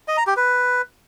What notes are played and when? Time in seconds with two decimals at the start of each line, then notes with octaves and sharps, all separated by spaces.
0.08 D#5
0.17 A#5
0.27 G4
0.37 B4